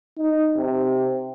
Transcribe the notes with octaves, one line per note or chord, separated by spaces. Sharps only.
D#4
C3